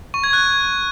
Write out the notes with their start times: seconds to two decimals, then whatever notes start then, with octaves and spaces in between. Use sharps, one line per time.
0.14 C#6
0.24 G#6
0.33 F#6